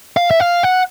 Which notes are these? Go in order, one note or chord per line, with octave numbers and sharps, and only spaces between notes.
F5
E5
F5
F#5